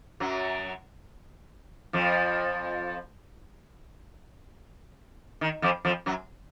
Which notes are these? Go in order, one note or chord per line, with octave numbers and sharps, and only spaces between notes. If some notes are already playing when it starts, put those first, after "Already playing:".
F#2 F#3
F2 F3
D#3
F2 F3
F2 F3
F#2 F#3